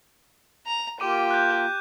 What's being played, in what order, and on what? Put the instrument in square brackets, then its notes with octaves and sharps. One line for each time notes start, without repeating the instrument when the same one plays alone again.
[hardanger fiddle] A#5
[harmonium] A#3 F4 [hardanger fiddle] G4 [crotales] D6 D#7
[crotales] F#6 G6